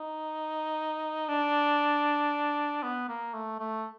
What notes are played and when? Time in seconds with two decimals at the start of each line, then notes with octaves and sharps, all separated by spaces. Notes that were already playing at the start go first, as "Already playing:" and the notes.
Already playing: D#4
1.28 D4
2.83 B3
3.09 A#3
3.33 A3
3.59 A3